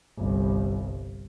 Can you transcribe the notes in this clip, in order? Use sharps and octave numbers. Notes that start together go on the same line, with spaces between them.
G1 C2